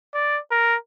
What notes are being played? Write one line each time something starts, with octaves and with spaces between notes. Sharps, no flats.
D5
A#4